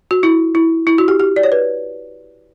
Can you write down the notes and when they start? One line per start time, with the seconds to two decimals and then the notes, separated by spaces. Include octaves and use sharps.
0.11 F#4
0.23 E4
0.55 E4
0.87 E4
0.98 F#4
1.08 G4
1.20 G4
1.36 D5
1.43 C#5
1.52 B4